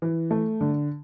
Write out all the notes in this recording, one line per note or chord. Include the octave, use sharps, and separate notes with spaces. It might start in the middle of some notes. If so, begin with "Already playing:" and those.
E3
A3
D3